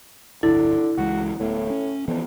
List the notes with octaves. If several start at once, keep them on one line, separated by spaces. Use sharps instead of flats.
D1 G1 D3 E4
C#2 E3 G#3 F#4
D1 A2 A3 B3
C#4
F2 E3 F3 B3